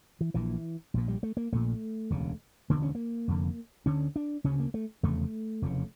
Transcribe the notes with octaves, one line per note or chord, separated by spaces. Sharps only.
E3
A#1 A#2 E3
A#1 A#2
G3
A3
A#3
A#1 A#2 A3
E1 D2 C#3
E1 D2 D3 A#3
C#4
A#3
F1 F2 D3
D2 D3 C#4
D4
D2 C#3 C#4
A#3
A3
F1 E2 C#3 A3
F1 E2 C#3